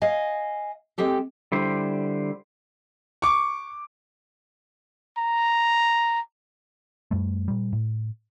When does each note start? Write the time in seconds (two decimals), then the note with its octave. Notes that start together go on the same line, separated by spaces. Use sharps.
0.02 D#5 F5 G#5
0.98 G#3 C4 G4 A4
1.52 D3 G3 E4 C5
3.22 C#6 D6
5.18 A#5
7.11 F#2 G3 A3
7.48 A#2 G3
7.73 A2